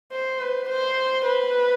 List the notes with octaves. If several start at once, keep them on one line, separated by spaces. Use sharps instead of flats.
C5
B4
C5
B4